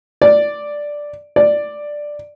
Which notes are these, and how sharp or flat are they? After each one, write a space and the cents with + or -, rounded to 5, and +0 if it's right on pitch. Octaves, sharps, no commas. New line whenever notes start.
D5 +0
D5 +5